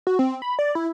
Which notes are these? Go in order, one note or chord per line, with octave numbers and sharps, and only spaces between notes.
F#4
C4
B5
D5
E4